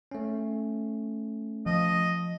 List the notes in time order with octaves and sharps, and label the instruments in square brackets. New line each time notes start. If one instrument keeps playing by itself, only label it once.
[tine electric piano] A3 C#4
[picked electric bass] F3 [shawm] D#5